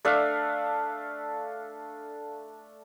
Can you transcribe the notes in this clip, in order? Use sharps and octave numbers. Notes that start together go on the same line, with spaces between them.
A3 D4 E5 F5